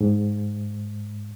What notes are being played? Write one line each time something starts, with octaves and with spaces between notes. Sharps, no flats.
G#2